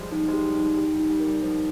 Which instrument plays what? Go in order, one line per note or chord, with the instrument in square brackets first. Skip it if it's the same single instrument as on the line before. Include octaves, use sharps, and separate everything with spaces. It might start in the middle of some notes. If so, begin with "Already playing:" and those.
Already playing: [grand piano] F3 G3 G#3
[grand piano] F3 G#3 [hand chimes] D#4
[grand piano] F3 G#3
[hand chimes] G4
[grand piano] G3
[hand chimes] D#4
[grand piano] G3
[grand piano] G3 [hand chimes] G4
[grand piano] G3
[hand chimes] D#4
[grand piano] G3
[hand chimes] A#4
[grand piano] G3
[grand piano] F3 [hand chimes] D#4